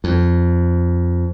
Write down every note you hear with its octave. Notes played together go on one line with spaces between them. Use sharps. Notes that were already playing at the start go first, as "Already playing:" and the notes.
F2